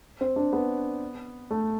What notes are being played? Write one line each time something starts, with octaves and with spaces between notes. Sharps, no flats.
C4
D4
B3
A3